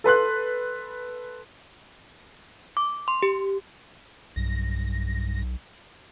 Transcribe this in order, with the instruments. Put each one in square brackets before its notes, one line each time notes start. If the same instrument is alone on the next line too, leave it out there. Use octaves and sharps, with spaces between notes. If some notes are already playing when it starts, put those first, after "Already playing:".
[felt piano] A4 B4 C6 F#6
[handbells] D6
C6
G4
[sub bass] B1 [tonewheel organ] G2 A#6